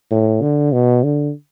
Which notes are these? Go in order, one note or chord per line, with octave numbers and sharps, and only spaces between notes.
A2
D3
B2
D3